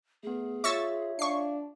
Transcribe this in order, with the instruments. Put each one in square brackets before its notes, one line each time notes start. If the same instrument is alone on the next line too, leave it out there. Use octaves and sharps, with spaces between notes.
[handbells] A3 B3 [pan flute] G#4
[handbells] F4 C#5 E5 [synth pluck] C#6 E6 A6
[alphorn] D4 [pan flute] F5 [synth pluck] C#6 C7